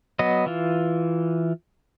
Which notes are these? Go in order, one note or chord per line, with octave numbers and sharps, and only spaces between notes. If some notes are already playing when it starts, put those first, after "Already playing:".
F#3 B3 D#5
E3 F4